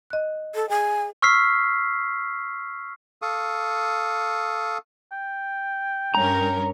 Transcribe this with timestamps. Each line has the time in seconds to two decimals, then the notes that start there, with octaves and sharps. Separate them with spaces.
0.10 D#5 F#6
0.55 A4
0.70 G#4 G#5
1.22 C#6 E6 F6 B6 C7
3.22 A4 F5 C#6 D#6
5.12 G5
6.15 G2 C#4 A#4 A#5